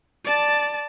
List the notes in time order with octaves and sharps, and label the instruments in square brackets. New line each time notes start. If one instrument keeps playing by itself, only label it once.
[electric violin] D5 A5